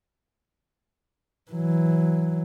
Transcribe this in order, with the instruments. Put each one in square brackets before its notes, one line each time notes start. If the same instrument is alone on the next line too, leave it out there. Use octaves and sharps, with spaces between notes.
[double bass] E3 F#3